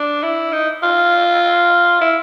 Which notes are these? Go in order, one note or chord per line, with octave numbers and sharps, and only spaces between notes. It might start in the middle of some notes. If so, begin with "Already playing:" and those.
Already playing: D4
E4
D#4
F4
E4